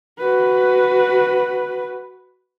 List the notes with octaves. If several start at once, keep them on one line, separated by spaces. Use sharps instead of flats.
F#4 B4